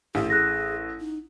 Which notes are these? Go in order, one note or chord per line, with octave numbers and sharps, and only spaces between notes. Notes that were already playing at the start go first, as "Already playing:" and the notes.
A1 G4
G#4 F#6 A#6
D#4